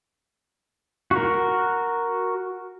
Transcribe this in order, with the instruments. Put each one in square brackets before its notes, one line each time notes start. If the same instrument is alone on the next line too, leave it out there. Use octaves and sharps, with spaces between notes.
[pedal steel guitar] F#4 A#4